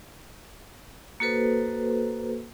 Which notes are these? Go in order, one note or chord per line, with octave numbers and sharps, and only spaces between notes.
A#3 F#4 A4 B4 C5